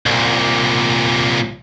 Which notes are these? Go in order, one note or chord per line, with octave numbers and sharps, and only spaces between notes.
C2 A#2